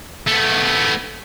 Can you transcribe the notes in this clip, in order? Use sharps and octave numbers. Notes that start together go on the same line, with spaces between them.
A3 B3